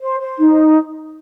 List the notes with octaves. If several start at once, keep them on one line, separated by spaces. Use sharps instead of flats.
C5
C5
D#4